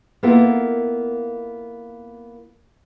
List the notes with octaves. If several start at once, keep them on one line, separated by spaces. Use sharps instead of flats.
A#3 B3 E4 F4 A4 A#4